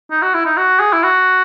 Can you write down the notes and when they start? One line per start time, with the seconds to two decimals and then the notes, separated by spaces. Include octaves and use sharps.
0.10 D#4
0.22 F#4
0.34 E4
0.45 D#4
0.57 F#4
0.80 G#4
0.93 E4
1.03 F#4